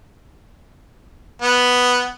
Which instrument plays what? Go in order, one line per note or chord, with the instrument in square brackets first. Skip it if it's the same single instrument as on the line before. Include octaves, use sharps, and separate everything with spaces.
[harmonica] B3